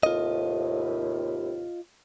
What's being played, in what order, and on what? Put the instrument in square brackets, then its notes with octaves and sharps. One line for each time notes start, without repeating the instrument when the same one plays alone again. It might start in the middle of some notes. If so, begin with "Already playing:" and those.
[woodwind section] D#2 A2 C3 [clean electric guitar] F4 D#5